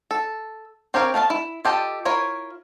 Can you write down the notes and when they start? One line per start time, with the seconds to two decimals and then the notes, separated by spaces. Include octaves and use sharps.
0.11 A4
0.94 C4 G4 A#4 C#5 F5
1.14 A3 B3 F5 A5
1.30 E4
1.65 F4 G4 A4 D#5
2.05 E4 F4 A#4 C#5